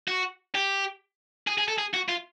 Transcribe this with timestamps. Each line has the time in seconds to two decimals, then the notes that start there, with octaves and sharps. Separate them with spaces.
0.08 F#4
0.55 G4
1.47 G#4
1.58 G#4
1.68 A4
1.78 G#4
1.94 F#4
2.08 F4